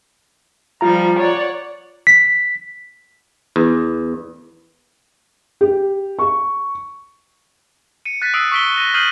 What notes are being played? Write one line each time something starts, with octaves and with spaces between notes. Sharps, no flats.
F3 G3 F4 F5 A#5
C#5 D5 F#5
B6
E2
G4
C#6
C#7 D#7
F#6 A6 B6 D#7
D#6 E6 C7 D7
C#6 E6 B6 D7 G7
A#6 D#7
D#6 F6 G6 C7 D#7 F#7